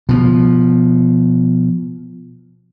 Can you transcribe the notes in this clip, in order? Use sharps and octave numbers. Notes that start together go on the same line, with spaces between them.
B2 F3